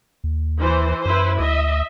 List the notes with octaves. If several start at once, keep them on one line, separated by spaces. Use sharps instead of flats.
D#2
E3 C5
F#2 E4 B4 C5
D2 D#5 E5